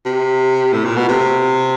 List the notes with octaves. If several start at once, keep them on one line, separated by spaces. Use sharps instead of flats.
C3
A2
A#2
B2
C3